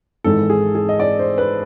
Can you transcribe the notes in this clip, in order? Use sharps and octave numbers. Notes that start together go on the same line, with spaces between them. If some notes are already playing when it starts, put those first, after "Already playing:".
G#1 G#2 E3 G#3 A4
G#4
G#4
D#5
D5
C5
B4